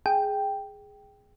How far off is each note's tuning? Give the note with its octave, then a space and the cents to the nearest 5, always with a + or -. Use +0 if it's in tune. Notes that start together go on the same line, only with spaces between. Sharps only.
G#4 +0 G5 +0